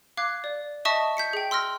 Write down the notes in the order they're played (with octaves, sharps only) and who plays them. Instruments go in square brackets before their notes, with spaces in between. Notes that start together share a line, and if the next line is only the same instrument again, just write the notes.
[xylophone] F5 D6 F#6 G#6
D5
D#5 E5 A5 C#6 D#6
G6 B6 C#7
G#4 G5
C6 E6 F6 A#6